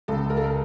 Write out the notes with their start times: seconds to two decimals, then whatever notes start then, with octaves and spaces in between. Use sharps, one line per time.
0.08 C#2 A4
0.30 A#4
0.37 A4
0.44 A#4